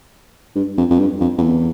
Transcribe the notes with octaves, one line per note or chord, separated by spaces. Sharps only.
G2
F2
F2
G2
F2
F2
E2